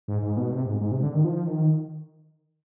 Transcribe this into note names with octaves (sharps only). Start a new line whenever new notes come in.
G#2
G#2
B2
C3
G#2
G#2
C3
D3
D#3
F3
D#3